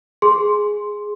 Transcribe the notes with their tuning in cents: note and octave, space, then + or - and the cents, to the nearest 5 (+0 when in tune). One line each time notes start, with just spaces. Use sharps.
G#4 +0 C6 +0